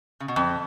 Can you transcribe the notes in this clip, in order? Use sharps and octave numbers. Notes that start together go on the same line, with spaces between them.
C#3
B2
F2